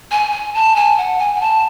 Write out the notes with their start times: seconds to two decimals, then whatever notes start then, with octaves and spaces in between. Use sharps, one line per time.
0.11 G#5
0.32 G#5
0.54 A5
0.76 G#5
0.97 F#5
1.19 G#5
1.36 G#5
1.41 A5